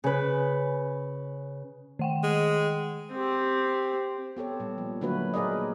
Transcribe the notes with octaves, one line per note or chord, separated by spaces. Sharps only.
C#3 B4
D#3 F#5 G5
G#3
C4 G4
B3 G4 A4 C#5
A#2 G3
F3
D3 F#3 A3 A#3 F#4 B4
A#2 G#4 A#4 B4 D5 D#5